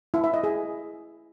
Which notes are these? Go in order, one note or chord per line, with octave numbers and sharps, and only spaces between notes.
E4
E5
D#5
G#4